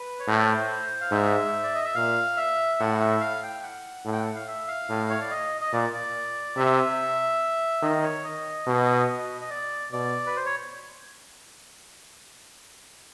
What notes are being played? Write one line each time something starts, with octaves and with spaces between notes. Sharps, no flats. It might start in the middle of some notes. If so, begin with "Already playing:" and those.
Already playing: B4
C#5
A2 C5
F5
G#2 E5
D5
D#5
E5
A#2 F5
E5
A2 F#5
E5
F5
G5
F#5
A2
G5
F#5
F5
E5
F5
A2
C#5
D5
D#5
D#5
A#2 D5
D5
C3 E5
D#3 D#5
C#5
D#5
B2
D#5
D5
B2 D5
B4
C5
C#5